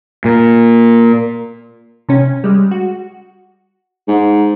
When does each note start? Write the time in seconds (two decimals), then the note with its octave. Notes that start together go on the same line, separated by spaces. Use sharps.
0.25 A#2
2.09 C3 C#4
2.44 G3 G#3
2.71 F#4
4.08 G#2